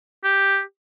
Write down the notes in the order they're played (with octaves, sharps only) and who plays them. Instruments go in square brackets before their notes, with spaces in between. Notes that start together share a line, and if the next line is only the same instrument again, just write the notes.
[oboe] G4